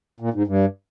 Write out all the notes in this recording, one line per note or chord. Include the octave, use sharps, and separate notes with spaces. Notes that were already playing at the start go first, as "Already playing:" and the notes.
A#2
G#2
G2